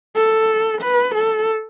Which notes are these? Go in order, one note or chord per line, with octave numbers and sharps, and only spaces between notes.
A4
B4
A4